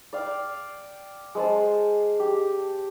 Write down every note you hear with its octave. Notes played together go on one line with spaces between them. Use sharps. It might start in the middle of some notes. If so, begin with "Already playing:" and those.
D5 F5 G5
G#3 C5 A5
G4